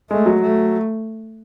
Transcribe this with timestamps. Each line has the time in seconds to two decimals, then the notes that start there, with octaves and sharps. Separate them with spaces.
0.10 G#3 A3
0.26 F#3
0.42 A3